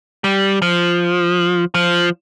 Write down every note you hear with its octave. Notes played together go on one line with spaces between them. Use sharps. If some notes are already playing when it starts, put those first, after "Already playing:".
G3
F3
F3